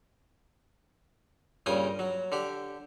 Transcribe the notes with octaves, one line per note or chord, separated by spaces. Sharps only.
G2 A#2 C#3 G5 G#5 D#6
F#3
D3 G4